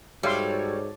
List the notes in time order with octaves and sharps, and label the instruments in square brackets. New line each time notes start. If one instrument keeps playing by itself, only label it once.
[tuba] G#2 [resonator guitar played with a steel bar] G3 [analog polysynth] F#4 A4 C#5 [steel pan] E5 F5 C6